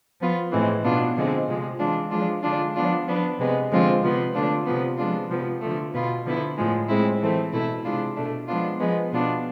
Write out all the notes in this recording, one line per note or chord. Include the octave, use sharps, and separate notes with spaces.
F3 B3 F4
A2 E3 G#3 C4
B2 B3 D4 F4
D3 F3 G#3 C4
C3 F3 G#3
E3 G#3 D4 F4
F3 G#3 D4 F4
D3 G#3 D4 F4
F3 B3 D4 F4
F3 B3 D4
C3 G#3 B3
D3 F3 G#3 C4 F4
C3 F3 B3
D3 A3 D4 F4
C3 F3 B3
F3 G#3 D4 F4
C3 F3 B3
D3 F3 A3
B2 B3 F4
D3 F3 B3 E4
A2 F3 G#3
A2 G#3 C4 E4
E3 A3 C4
B2 A3 E4
C3 G#3 D4 F4
B2 A3 D4
F3 G#3 B3 D4 F4
F3 G#3 B3
B2 B3 D4 F4